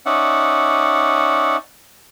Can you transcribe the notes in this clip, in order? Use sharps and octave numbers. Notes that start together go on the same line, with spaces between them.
C#4 D#4 D5 E5 F#5